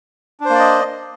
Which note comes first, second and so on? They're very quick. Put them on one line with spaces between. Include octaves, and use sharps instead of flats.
D4 C5 A#3 D5 D#5